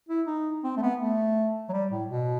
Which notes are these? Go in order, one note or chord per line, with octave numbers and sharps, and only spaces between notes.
E4
D#4
C4
A3
B3
A3
F#3
G3
A2
B2